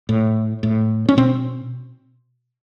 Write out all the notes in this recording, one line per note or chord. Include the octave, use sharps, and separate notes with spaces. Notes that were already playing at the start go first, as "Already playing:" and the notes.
A2
A2
C#4
B2 C4